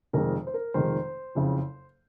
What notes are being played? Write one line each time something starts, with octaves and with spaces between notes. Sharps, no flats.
F1 F2 D#3 G#3 A#4
C5
A#4
F1 F2 D#3 G#3 C5
F#1 F2 C#3